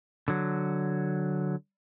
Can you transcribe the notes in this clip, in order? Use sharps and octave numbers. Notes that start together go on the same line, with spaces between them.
D3 F#3